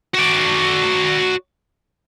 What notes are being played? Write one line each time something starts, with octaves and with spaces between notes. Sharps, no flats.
F#4 D5